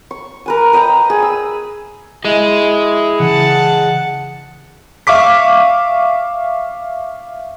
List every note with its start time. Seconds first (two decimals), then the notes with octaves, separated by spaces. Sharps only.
0.11 C#6
0.46 A#4 B4 G#5
0.73 B4 D#5 G5 A#5
1.10 G#4
1.23 E6
2.25 E4 G#4 D#5
3.20 C#3 E3 F#5 A5
5.07 E5 F5 C#6 D6 B6